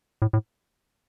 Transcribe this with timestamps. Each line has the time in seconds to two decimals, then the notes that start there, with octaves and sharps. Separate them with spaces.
0.22 A2
0.33 A2